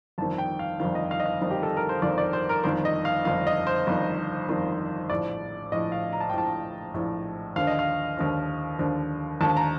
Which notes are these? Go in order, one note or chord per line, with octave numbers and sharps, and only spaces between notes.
G1 F2 D#3 A5
G5
F5
G1 F2 D#3 F5
D#5
F5
D#5
F5
G1 F2 D#3
G4
A4
A#4
C5
G1 F2 D#3 D5
D5
C5
A#4
G1 F2 D#3 C5
D#5
F5
G1 F2 D#3 F5
D#5
C5
G1 F2 D#3
G1 F2 D#3
A#1 A2 F3 D5
A#1 A2 F3 D#5
F5
A#5
A5
G5
A#1 A2 F3 A5
A#1 A2 F3
D#2 D3 F3 F5
D#5
F5
D#2 D3 F3
D#2 D3 F3
D#2 D3 F3 A5
A#5